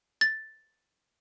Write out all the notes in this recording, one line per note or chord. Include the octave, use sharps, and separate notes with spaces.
A6